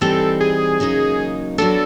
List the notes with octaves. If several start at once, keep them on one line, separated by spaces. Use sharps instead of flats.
E3 G3 C4 D#4 A4
G#4
C#3 F#3 A#3 D#4
F#3 B3 D4 A4